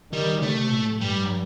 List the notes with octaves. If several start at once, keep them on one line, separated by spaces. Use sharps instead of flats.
D#3 G3
C3 A3
A2
G2 G3